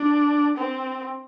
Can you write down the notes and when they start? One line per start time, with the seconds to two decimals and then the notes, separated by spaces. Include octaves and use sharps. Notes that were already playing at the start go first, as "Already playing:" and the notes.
Already playing: D4
0.58 C4